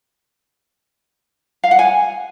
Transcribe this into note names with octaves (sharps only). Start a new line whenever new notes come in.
F5
F#5
G#5